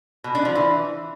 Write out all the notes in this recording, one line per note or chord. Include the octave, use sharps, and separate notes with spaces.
B2
D4
F3
E3